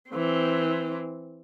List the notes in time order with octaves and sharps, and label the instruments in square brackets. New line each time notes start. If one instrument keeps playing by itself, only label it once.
[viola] E3 C4